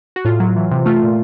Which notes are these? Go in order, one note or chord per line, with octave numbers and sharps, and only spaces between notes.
F#4
A2 F4
F#3
E3
C3
A3 F4
A#2